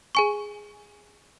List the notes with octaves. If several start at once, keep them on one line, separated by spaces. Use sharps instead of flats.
G#4 G#5 C#6